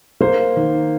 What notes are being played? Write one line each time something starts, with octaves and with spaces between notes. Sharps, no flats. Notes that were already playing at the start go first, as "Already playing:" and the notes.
A#3 C5
D#3